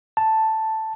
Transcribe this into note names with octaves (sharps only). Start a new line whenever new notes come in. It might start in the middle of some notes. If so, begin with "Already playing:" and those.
A5